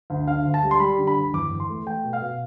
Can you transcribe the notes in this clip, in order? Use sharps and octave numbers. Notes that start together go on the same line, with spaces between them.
D2
D3 F5
D2
A5
G3
C6
G3 B5
D3
B5
D2
E2 D6
E2
C6
A3
A3 G5
B2
F5
B2